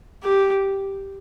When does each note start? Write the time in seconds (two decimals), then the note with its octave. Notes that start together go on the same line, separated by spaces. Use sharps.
0.24 G4